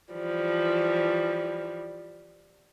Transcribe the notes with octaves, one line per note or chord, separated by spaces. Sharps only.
E3 F3 G3